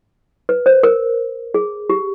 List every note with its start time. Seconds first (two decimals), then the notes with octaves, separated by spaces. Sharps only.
0.49 B4
0.66 C5
0.83 A#4
1.54 G#4
1.90 G4